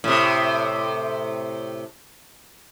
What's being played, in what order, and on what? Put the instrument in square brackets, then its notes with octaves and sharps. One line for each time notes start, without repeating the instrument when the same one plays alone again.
[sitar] A2 C3